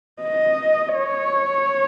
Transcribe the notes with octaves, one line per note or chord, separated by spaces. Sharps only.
D#5
C#5